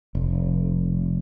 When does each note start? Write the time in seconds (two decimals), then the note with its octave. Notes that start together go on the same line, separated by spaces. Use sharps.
0.15 F1